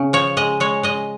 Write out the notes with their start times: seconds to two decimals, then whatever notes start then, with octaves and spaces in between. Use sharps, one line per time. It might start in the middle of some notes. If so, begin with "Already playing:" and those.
Already playing: C#3
0.13 F3 C#5
0.37 G#3 D#5
0.60 G#3 C#5
0.83 G#3 D#5